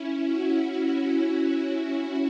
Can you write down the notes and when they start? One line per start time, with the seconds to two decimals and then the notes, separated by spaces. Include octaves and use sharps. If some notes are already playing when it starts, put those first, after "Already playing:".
Already playing: C#4 E4
0.25 F#4